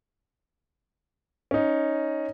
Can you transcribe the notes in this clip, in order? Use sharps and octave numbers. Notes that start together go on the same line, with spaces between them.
C#4 D#4